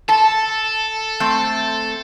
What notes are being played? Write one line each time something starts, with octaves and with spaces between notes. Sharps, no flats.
A4 A5
A3 C4